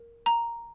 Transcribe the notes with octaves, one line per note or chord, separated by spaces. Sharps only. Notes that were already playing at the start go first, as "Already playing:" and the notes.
Already playing: A#4
A#5